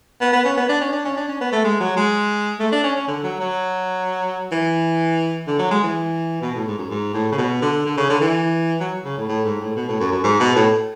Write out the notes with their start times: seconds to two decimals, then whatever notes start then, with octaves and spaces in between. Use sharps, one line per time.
0.21 B3
0.33 B3
0.45 C#4
0.57 B3
0.69 D4
0.81 C#4
0.93 D4
1.05 C#4
1.17 D4
1.28 C#4
1.41 B3
1.52 A3
1.64 G#3
1.80 F#3
1.96 G#3
2.59 A3
2.72 D4
2.84 C#4
2.96 C#4
3.08 D3
3.24 F#3
3.40 F#3
4.52 E3
5.47 D3
5.58 F#3
5.71 G#3
5.83 E3
6.42 B2
6.54 A2
6.67 G#2
6.78 F#2
6.90 G#2
7.14 A2
7.32 C#3
7.37 B2
7.62 D3
7.85 D3
7.97 C#3
8.10 D3
8.21 E3
8.80 F#3
9.05 C#3
9.17 A2
9.28 A2
9.45 G#2
9.61 A2
9.76 B2
9.88 A2
10.00 F#2
10.12 F#2
10.24 G#2
10.40 B2
10.56 A2